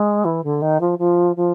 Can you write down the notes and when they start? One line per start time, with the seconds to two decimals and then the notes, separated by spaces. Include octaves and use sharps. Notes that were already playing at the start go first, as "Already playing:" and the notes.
Already playing: G#3
0.25 E3
0.44 D3
0.62 D#3
0.81 F3
0.99 F3
1.36 F3